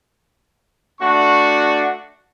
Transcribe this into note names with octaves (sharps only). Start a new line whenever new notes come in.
A3 D4 F#4 C#6